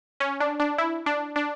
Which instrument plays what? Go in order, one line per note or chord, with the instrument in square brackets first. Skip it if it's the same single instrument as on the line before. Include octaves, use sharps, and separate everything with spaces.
[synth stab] C#4
D4
D4
E4
D4
D4